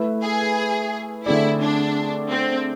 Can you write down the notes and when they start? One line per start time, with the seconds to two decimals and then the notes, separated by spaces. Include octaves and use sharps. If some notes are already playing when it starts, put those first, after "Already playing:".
Already playing: A3 E4 B4 E5
0.23 G#4
1.26 D3 A3 C4 E4 G#4 D5
1.61 D4
2.30 C4